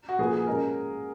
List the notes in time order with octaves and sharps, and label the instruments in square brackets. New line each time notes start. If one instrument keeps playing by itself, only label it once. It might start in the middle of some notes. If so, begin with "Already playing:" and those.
[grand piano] F#4
[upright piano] A#2 F3 A#3 F4 B4 [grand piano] G#4
[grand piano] G#4
[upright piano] G#3 C#4 G#4 D#5 [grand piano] A#4